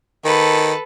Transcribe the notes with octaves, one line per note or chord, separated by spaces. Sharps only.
D#3 A4 B4